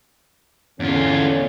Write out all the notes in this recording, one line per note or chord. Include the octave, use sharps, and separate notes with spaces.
E2 D3 C#4 F4